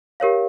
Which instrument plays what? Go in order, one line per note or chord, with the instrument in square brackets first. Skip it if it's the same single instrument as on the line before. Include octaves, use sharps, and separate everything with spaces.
[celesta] G4 A#4 C#5 F5